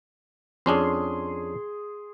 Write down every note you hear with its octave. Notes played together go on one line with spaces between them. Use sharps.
F2 C#4 D4 G#4 C6